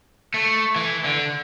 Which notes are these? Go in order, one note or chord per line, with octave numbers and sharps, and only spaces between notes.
A3
E3
D3